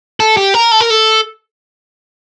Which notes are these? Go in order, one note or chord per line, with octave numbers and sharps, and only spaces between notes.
A4
G4
A#4
A4
A#4
A4